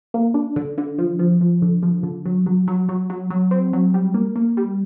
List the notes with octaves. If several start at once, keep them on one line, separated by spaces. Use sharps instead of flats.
A#3
D4
D3
D3
F3
F3
F3
D3
F3
D3
F#3
F#3
F#3
F#3
F#3
F#3
C4
F#3
G3
A#3
A#3
G3